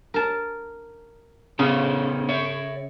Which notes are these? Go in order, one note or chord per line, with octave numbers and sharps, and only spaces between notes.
A#4 A5
C#3 B3 C#4 A4
C#5 E5